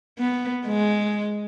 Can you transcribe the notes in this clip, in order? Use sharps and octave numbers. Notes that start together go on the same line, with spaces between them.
B3
G#3